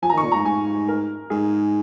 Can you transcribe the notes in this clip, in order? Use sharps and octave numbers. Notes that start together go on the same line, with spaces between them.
F3 G#5
A#5
D#3
C#6
A#2
G#2 A#5
G#2 G#5
A#4
G#2 G#4